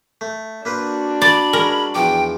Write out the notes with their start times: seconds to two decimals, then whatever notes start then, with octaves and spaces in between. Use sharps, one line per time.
0.21 A3
0.65 A#3 D4 F#4 B4 C5
1.22 D5 B5
1.53 G#3 C#4 A#4
1.95 E2 F3 G5 D6